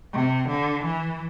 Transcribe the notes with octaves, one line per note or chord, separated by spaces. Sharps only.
C3
D3
E3